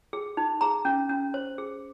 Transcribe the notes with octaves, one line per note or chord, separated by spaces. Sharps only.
G#4
D#4
G#4 A#5
C#4
C#4
C5
G#4